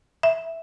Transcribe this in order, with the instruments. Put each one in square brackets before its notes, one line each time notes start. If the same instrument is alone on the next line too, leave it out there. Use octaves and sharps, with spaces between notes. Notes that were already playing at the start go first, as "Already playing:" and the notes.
[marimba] E5